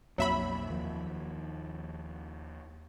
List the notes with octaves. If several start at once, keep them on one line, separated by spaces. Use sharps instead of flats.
B1 F2 F#3 A#3 E5 B5
D#2 D#3 F3